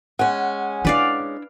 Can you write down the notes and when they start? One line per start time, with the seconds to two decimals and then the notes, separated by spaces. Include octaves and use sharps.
0.19 G#3 C#4 F#5
0.85 D4 E4 B4 D5 F5